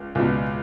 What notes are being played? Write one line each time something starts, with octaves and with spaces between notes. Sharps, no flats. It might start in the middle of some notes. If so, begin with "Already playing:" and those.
Already playing: C#2
C#2 B2